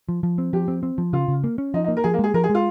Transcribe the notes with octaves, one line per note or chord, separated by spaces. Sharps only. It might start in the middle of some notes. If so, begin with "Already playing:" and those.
F3
F3
C4
F3 G4
C4
C4
F3
C#3 F4
C#3
A#3
C#4
F3 D#4
D#4
A#3
A#4
F3 G#4
A#3
G#3 G#4
F3 A#4
G#4
G#3
F4